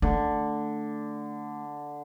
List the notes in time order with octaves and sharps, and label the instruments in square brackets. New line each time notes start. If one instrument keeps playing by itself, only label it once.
[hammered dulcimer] D3 [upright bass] A3